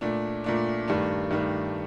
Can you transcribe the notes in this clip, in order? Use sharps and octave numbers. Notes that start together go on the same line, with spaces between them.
A#2 A3 D4
A#2 A3 D4
G2 D#3 A3 D4
G2 D#3 A3 D4